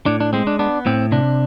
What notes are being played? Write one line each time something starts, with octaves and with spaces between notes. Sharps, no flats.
A2 D4
D4
G#3 C4
D4
B3 D4
A2 C4
C3 D4